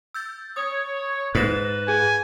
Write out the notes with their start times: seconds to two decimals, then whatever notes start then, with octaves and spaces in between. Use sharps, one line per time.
0.14 E6 G6 A6
0.56 C#5 D#6
1.35 G#2 B4 A6 A#6 E7
1.88 G#4 G#5